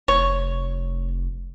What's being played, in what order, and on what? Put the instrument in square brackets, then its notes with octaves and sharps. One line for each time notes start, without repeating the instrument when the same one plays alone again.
[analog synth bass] F1 [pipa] C#5